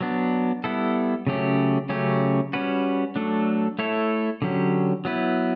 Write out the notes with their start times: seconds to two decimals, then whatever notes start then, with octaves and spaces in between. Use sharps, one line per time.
0.01 F#3 B3 D4
0.64 G3 B3 E4 A4
1.27 C#3 F#3 A3 C#4 G4
1.89 C#3 F#3 A3 C#4 G4
2.53 G3 C#4 F#4 B4
3.16 F#3 A3 D4 A4
3.79 A3 E4 A4 C#5
4.42 D3 F#3 C#4 G4
5.05 F#3 B3 E4 B4